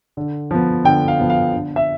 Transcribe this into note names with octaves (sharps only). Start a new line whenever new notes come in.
D3
F3 B3
D3 G5
F5
F3 B3
F5
D3
E5